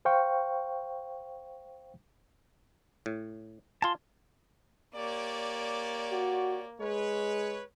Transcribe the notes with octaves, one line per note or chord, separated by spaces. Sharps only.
C5 F5 G5 C#6
A2
F4 G#5 A5 C6
A#3 G4 C#5 D5
F#4
G#3 B4 C#5